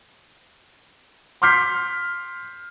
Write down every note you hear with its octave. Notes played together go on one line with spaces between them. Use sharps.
C6 D6 F6 G6 B6 C7